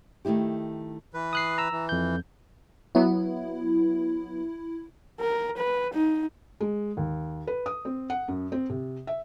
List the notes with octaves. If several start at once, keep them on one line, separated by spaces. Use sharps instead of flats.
D#3 A3 D#4 E4 G4
E3 B4
D#6 F#6 C7
A#5 E6
E3
F2 G6
F#3 B3 E4
A#4
B4
D#4
G#3
D#2
B4
D#6
C4
F#5
F#2
C4
C3
E5